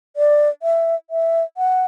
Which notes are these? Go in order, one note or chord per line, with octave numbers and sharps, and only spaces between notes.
D5
E5
E5
F#5